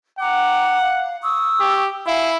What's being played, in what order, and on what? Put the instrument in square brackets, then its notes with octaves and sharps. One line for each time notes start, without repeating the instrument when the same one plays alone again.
[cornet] F#5 [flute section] G5 A#5 D6
[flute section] F5
C#6 D#6 E6
[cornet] G4
[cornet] E4 [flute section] F5 G#5 B5